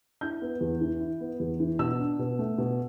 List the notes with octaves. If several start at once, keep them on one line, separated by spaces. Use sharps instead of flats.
E4 G6
B3
E2
E3
E4
B3
E2
E3
B2 E6
D4
B2
A3
B2